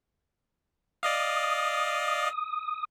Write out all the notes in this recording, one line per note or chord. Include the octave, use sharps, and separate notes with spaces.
D5 D#5 F5 D#6